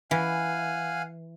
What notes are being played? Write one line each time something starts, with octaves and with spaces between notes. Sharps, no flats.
E3 F5 F#5 G#5